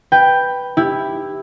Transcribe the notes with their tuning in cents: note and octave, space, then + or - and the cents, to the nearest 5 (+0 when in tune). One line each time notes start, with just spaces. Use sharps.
B4 +0 G5 +5
E4 +0 G4 +10